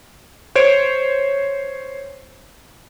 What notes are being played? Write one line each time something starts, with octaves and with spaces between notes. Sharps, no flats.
C5 C#5 D7